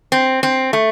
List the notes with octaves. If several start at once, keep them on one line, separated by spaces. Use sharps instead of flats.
C4
C4
A3